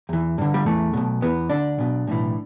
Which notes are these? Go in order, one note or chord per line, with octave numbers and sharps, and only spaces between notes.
E2 E3
G2 D3
G3
E2 E3 A3
B1 B2
E2 E3 B3
D2 D3 D4
B1 B2
B1 A2 E3